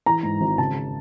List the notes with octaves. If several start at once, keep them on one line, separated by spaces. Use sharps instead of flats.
E3 A#5
G#2
G#1
C#3 A5